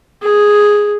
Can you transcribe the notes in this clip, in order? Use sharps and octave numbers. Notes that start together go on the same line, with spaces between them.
G#4